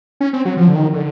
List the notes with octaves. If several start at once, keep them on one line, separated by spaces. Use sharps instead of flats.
C#4
C4
F#3
F3
D3
D#3
D3